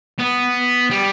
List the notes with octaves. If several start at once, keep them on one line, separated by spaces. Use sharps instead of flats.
B3
G3